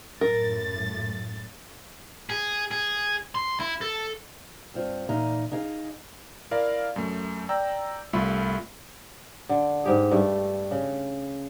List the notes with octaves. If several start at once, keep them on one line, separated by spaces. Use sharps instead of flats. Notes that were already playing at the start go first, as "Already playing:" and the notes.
F#2 A2 A#4 A6
G#4
G#4
C6
E4
A4
G2 C4 F4
A#2 E3 D#4 F5
D#4 G#4 F5
E4 A#4 D5 F5
F#2 A3
D5 G5 A#5 E6
C2 A3 F4 A4 E5 B5
D3
G#2 G4 G#4
G2 A3
C#3